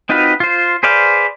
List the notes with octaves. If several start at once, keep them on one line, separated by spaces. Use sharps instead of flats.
C4 D#4 F4 F#4 B4
F4 C5
G#4 B4 C5 D5 F5